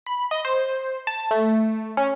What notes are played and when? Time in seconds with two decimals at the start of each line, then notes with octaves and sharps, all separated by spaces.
0.06 B5
0.31 D#5
0.45 C5
1.07 A5
1.31 A3
1.97 C#4